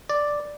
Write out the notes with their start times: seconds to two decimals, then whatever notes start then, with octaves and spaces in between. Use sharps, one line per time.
0.10 D5